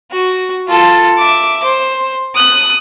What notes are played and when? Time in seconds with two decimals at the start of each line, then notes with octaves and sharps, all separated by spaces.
0.11 F#4
0.68 F4 A4
1.18 E5 D6
1.64 C5
2.35 D#6 F#6